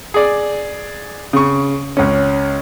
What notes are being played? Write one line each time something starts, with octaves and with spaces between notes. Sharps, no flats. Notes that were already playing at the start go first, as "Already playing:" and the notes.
G#4 D5
C#3 C#6
C#2 C#4